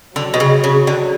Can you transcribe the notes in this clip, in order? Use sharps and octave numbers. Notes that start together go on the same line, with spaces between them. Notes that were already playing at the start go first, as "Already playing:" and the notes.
D3 F#3
B2
C#3
C#3
D3